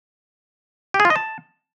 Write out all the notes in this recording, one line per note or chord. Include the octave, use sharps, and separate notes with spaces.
G4
G#4
F4
D#5
A5